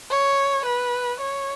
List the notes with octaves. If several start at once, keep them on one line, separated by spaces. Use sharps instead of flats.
C#5
B4
C#5